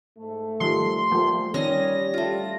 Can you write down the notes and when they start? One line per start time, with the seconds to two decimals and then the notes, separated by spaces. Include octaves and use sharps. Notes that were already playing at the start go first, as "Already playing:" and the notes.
0.19 G#2 A3
0.60 D#3 F3 G3 C6
1.12 F3 G3 A3 A#3
1.54 D#3 G3 C#4 D#5 G#5 A#6
2.14 A3 F4